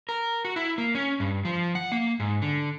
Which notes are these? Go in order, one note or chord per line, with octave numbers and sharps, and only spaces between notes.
A#4
F#4
E4
A#3
C#4
G2
F3
F#5
A#3
G#2
D3